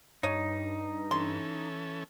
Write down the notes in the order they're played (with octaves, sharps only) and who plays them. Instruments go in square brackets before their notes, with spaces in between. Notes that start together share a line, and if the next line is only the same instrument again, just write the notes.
[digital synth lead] G2 [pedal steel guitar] D#4 [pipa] C#5 D#5
[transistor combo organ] E3 C#4 A4 [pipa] C6